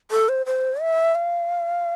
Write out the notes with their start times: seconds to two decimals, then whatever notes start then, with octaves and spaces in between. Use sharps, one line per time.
0.11 A4
0.29 C5
0.46 C5
0.81 E5
1.15 F5